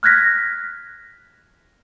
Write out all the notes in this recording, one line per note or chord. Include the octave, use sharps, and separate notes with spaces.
F6 F#6 G#6 A#6 B6